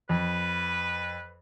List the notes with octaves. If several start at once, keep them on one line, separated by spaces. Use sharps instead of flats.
F2 B4